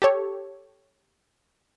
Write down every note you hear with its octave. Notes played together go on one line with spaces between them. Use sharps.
G4 A4 C#5